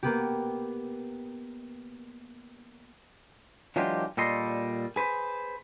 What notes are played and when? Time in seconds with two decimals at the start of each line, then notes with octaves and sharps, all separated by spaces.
0.03 A#3 B3 G4
3.76 E3 F#3 G#3 D4 F4 G4
4.17 A#2 G3 A4 D#5 C6
4.96 G#4 B4 C5